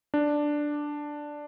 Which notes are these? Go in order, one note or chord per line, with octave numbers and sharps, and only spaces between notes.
D4